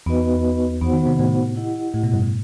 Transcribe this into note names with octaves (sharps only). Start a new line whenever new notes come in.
E2 B3 D#4 F#4 B4 D#5
E2 B3 D#4 F#4 C5 F#5
D#3
C3
A2
E4 G4 D#5 F#5
A2
B2
G2
A2